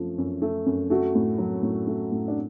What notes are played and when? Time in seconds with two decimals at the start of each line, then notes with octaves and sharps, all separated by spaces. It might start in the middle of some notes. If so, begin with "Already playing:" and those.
Already playing: F#2 F3 A3
0.18 F#2
0.42 A3
0.66 F#2
0.90 A3 F#4
1.15 A2
1.38 F#3
1.63 A2
1.87 A3
2.12 A2
2.28 D4